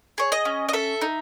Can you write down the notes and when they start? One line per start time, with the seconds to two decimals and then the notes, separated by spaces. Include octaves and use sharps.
0.18 G#4 C#5
0.32 D#5
0.45 C#4
0.69 D#5
0.73 A4 E5
1.01 D#4